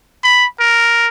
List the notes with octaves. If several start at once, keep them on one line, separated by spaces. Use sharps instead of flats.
B5
A#4